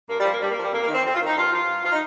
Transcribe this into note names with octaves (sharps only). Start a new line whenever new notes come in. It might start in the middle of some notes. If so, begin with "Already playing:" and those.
G2 A#3
G3
F3 A#3
G2 G3
A#3
F3 G3
F2 A#3
A#3
D#3
C4
F2 C4
F4
D#3
D#4
G2 F4
F3 F4
G2
F3 F4
D#4